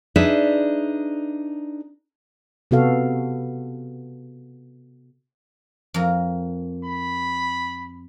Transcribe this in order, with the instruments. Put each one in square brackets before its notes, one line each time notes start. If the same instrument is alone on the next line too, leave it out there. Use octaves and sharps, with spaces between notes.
[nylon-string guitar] D4 D#4 G#4 B4 D5 E5
[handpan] C3 B3 F#4 A4 F5
[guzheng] F2 A#4
[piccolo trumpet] B5